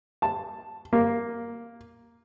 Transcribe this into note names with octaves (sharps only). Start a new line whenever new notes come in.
A5
A#3